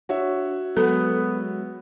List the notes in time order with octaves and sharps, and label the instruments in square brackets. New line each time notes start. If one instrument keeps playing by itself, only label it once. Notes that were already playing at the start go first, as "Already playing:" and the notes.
[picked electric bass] D4 [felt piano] F#4 C#5 E5
[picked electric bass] F#3 G#3 [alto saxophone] B3 [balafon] A4